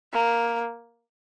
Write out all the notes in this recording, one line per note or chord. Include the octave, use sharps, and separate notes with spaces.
A#3